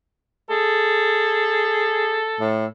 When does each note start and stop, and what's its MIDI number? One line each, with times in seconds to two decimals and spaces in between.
0.50 2.19 68
0.50 2.60 69
2.40 2.66 45